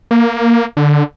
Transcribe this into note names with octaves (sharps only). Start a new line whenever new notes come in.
A#3
D3